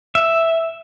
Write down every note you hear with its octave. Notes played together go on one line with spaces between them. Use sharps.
E5